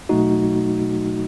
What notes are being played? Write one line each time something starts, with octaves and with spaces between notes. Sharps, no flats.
B2 F#3 A3 D#4 F#4